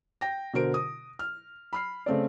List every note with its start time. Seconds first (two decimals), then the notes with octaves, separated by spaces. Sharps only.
0.21 G5 A#6
0.53 B2 D3 F#4 A#4 C5 D7
0.74 D#6
1.19 F6
1.73 B5 F6 C7
2.06 C#3 A3 C4 D5